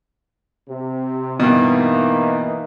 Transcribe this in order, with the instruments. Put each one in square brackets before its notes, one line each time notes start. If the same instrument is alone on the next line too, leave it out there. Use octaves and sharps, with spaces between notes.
[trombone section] C3
[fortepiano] G2 B2 [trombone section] E3 A#3 D#4